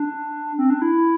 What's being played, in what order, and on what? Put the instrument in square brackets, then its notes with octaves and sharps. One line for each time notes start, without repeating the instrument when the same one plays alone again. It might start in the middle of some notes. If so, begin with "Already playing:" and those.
Already playing: [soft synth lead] D4
C4
D4
E4